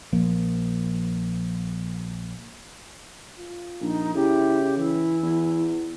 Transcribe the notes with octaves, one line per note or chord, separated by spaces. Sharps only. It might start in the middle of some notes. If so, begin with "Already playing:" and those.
A#1 F3 A#3
F4
A#1 D#4
C#3 E4 G4
E3 E4
E2